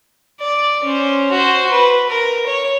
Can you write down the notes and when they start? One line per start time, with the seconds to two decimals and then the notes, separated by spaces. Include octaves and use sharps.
0.41 D5
0.84 C#4 C5
1.32 F#4 C5
1.71 B4
2.09 A#4
2.46 C#5